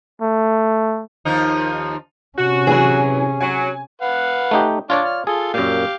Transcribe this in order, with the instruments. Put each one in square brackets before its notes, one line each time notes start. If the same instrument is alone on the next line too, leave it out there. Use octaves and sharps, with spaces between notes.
[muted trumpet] A3
[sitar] D#2 F3 D#4
[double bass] C3 C#4 [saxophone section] F#4
[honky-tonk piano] E3 F#3 [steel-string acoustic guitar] G#4
[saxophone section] F#3 [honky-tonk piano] G#5
[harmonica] B4 F5 F#5
[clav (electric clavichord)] A3 D#4 G4
[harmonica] D4 [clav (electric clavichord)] F4 C#5 D5
[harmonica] F6
[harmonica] F4 A4 [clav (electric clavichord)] G#4
[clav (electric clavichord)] F#2 A#2 [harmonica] G4 F5